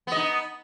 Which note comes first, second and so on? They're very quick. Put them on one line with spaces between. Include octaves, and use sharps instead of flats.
B3 D#5 D#4